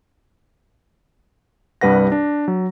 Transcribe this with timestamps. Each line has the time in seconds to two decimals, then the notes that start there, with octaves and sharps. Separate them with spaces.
1.81 C2 G2 G3 B4 F#5 A#6
2.12 D4
2.48 F#3